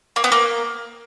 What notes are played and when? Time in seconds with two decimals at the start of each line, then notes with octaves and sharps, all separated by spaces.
0.16 A#3
0.24 B3
0.32 A#3